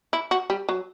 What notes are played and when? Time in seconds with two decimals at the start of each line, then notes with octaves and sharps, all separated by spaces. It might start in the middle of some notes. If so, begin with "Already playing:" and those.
0.13 E4
0.31 F#4
0.50 G3
0.69 F#3